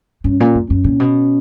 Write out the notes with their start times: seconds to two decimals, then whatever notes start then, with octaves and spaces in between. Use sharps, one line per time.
0.24 G2 C#4
0.40 A#2
0.55 F#2
0.69 F#2 C#4
0.84 A#2
1.00 B2